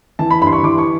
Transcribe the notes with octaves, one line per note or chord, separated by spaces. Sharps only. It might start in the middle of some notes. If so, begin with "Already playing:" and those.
E3 A5
B5
G2 B5
C6
C#6
E3 D6
C#6